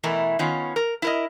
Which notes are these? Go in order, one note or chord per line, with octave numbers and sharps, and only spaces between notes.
B2 E3 A3 E4 A#4
D#3 B3 C#4 F4
A#4
E4 A#4 D#5